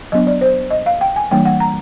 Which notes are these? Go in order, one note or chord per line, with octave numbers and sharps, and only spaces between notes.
F#3 B3 D4 D#5
D5
C5
D#5
F5
G5
G#5
E3 G3 A#3 D4 G5
F#5
A#5